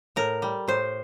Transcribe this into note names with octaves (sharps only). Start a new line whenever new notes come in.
A2 A#4
G3
A2 C5